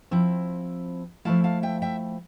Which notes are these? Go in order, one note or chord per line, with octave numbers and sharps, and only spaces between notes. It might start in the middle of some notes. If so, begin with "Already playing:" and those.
F3 C4 E4
F3 A3 E4 F5 A5
F5 A5
E5 G5
E5 G5